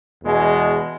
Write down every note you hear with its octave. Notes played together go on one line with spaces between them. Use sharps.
E2 B2 G#3